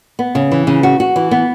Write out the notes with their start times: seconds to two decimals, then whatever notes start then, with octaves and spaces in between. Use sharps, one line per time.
0.19 B3
0.35 C#3
0.51 E3
0.67 C#3
0.83 F#4
1.00 F#4
1.16 E3
1.31 B3